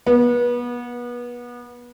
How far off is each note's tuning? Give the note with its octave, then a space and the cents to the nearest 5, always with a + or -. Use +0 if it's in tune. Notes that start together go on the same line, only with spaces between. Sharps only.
B3 -30